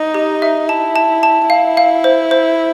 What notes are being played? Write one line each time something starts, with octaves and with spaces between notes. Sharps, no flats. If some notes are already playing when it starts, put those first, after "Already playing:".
Already playing: D#4
G4
E5
E4 A5
A5
A5
E4 F5
F5
C5
C5